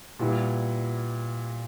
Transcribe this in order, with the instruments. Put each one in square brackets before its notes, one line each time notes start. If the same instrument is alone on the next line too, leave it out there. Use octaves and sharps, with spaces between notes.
[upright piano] A#2 G3 B3 E4